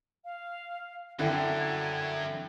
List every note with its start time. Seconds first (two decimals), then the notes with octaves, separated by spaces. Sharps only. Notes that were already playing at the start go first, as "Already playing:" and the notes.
0.25 F5
1.19 F#2 D3 E4 G5 G#6